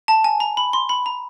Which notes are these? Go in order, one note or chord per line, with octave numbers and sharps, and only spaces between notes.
A5
G#5
A#5
B5
C6
B5
A#5